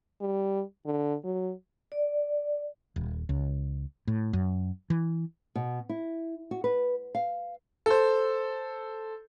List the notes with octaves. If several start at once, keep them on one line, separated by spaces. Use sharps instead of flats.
G3
D3
F#3
D5
D#1
C#2
A2
F#2
E3
B2
E4
F#4
B4
F5
A4 C5